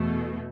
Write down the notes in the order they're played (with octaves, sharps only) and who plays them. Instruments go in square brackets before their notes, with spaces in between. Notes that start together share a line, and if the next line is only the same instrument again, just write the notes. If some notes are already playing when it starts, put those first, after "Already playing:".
Already playing: [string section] E2 B2 A3